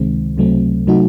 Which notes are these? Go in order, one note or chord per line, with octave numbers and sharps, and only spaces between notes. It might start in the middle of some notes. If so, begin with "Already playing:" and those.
Already playing: C#2 C3 D#3 G#3 C4
C#2 C3 F#3 A3 C4
C3 F#3 A3 D#4 F#4